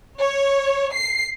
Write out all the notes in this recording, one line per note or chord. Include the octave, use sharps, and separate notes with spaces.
C#5
C7